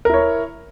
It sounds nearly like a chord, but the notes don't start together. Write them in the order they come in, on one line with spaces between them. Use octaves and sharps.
A#4 E4 C#5